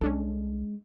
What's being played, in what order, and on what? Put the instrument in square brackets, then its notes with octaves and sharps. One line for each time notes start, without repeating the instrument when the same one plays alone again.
[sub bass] C2 [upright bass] G#3 [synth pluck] C#4 D4 A4